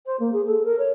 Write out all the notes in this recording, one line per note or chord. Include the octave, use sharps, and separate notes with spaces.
C5
A#3
G#4
A4
A#4
C#5